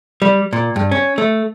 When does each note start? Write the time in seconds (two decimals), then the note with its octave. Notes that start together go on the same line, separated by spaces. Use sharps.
0.22 G3
0.53 A#2
0.76 G2
0.91 C#4
1.18 A3